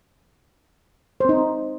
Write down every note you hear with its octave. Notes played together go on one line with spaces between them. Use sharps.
C4 D#4 C5